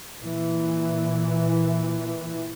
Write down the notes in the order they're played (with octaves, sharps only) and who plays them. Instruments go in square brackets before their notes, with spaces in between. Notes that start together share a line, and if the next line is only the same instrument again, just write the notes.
[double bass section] A#2 E3